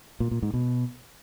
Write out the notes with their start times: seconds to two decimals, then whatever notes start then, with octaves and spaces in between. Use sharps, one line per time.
0.20 A#2
0.31 A#2
0.42 G#2
0.54 B2